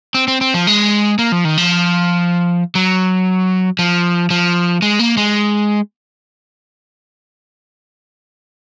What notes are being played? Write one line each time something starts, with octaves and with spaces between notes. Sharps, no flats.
C4
C4
C4
F3
G#3
A#3
F3
D#3
F3
F#3
F3
F3
G#3
A#3
G#3